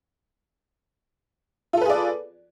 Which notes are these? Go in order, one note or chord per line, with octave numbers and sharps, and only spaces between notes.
F4 G#4 A4 B4 D5